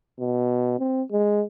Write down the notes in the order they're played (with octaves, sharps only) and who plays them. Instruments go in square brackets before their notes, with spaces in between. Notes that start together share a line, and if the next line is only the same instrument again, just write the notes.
[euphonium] B2
C4
G#3